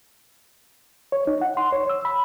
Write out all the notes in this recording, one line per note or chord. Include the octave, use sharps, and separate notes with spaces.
C#5
D#4
F#5
C6
C#5
E6
B5